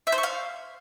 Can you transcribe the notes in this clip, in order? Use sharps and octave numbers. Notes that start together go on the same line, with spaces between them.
E5
C5
C#6
F5